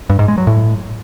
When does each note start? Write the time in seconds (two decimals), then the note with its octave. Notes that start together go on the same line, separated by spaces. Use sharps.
0.10 G2
0.19 G#2
0.28 G#3
0.38 F#3
0.47 A2